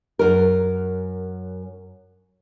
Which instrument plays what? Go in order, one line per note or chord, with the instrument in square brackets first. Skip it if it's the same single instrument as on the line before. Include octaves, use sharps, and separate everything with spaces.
[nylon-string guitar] F#2 A#4